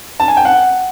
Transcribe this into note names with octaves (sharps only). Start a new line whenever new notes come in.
A5
G#5
G5
F#5